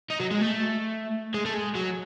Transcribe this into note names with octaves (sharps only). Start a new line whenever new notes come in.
D#4
F#3
G#3
A3
G#3
A3
G#3
F#3